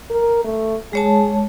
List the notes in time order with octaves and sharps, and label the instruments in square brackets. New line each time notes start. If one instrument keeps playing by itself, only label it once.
[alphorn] A#4
A3
[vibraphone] G#3 C#5 A5 [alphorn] G#4